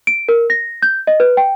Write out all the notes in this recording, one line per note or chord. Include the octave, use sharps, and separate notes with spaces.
D7
A#4
A#6
G6
D#5
B4
G5